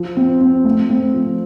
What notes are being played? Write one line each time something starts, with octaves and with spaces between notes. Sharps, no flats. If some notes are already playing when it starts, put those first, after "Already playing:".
Already playing: F3
C4
C4
A3
C4
F3